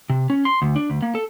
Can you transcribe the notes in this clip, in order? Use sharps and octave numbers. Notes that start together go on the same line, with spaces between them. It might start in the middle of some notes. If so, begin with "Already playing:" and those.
C3
C#4
C6
D2
D4
D2
A#3
A4